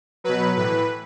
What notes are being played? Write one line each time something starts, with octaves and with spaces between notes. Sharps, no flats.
B2 F#3 B4
A2 E3 B4